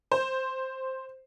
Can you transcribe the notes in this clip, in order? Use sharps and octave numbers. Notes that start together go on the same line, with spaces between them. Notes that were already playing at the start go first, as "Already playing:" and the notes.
C5